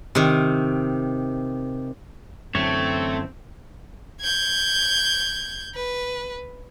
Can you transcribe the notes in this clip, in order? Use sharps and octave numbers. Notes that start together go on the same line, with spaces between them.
C3 D#3
F#2 D3 E3 A3 C4 C#5
G6 G#6
B4